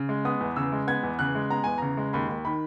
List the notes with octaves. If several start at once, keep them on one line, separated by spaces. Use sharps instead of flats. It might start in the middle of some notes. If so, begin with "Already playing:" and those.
Already playing: C#3
G#3
B3 D#6
E2
C#3 E6
G#3
B3 G#6
E2
C#3 F#6
G#3
B3 A#5
E2 G#5
C#3 A#5
G#3
D#2 B5
D#2
D#3 B5